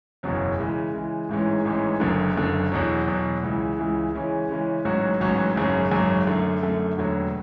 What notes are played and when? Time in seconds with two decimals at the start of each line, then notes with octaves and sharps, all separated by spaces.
0.23 F#1 E2 B2 F#3 C#4
0.58 C#3 E3 G#3
0.94 C#3 E3 G#3
1.29 A1 G#2 E3 G#3 C#4
1.65 A1 G#2 E3 G#3 C#4
2.00 F#1 F#2 D3
2.36 F#1 F#2 D3
2.72 E2 B2 F#3
3.07 E2 B2 F#3
3.43 C#2 C#3 E3
3.78 C#2 C#3 E3
4.14 C#3 E3 G#3 C#4
4.49 C#3 E3 G#3 C#4
4.85 A1 G#2 F#3 C#4 F#4
5.21 A1 G#2 F#3 C#4 F#4
5.56 G#1 F#2 C#3 F#3
5.91 G#1 F#2 C#3 F#3
6.27 F#2 D3 A3
6.62 F#2 D3 A3
6.97 E1 D2 D3 F#3